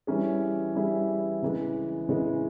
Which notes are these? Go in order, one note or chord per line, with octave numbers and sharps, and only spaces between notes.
E3 G3 C#4 E4 G#4
E3 G3 C#4 E4 G#4
C#3 E3 G#3
C#3 E3 G#3